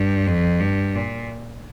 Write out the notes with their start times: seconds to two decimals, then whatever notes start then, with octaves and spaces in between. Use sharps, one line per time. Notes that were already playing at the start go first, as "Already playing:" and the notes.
Already playing: G2
0.26 F2
0.60 G2
0.95 A#2